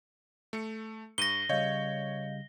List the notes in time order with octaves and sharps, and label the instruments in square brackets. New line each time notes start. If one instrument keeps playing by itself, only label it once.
[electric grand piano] A3 C#7
[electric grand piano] G2 D#7 [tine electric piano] C#6 [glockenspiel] A#6 G7
[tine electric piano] C#3 G3 [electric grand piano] C#5 [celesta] D#5 F5 G6